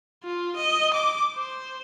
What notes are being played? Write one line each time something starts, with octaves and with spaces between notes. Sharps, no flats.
F4
D#5
D6
C5